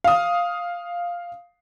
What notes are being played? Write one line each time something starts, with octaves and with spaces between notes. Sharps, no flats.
F5 D#6